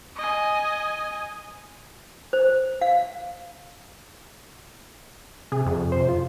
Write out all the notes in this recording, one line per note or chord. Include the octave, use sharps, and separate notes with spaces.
D#5 G#5
C5
F5
C3 G#4
F2
C3 C5
F4